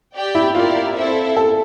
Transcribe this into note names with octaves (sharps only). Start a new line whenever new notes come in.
G4 D5 G5
E4
E4 F4 G4 A#4 D5
C4 E4 A4 C5 E5
A4